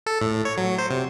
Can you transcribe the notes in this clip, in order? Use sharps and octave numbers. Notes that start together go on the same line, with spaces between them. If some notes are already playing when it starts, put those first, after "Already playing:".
A4
A2
C#5
F#3
C5
C3